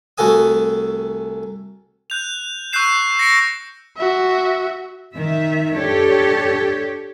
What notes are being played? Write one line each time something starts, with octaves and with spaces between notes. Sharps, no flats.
C2 A3 F#4 A4 G#5 D#6
F#6 G6 F7
C#6 E6 F#6 G6 C7 E7
A#6 C#7 D7
F#4 E5
D#3 E5
D4 G4 A4 C#5